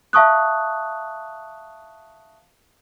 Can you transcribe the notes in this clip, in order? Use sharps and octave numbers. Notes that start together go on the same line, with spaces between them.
E5 F5 A5 C#6 D#6 F#6